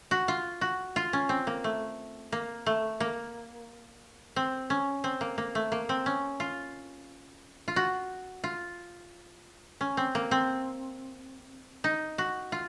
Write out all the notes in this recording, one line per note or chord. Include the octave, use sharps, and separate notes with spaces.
F#4
F4
F#4
F4
C#4
C4
A#3
A3
A#3
A3
A#3
C4
C#4
C4
A#3
A#3
A3
A#3
C4
C#4
F4
F4
F#4
F4
C#4
C4
A#3
C4
D#4
F#4
F4